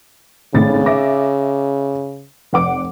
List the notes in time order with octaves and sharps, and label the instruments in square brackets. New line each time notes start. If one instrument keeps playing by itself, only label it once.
[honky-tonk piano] G#1 A2 A6 [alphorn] C#3
[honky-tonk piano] E5 D6 A#6
F1 F#5 D6